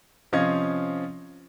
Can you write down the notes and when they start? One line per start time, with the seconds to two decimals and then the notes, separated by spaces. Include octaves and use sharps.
0.32 C3 F3 C#4 D#5 F5 G#6